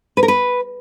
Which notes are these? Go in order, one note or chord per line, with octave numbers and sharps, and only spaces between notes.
B4
A#4
B4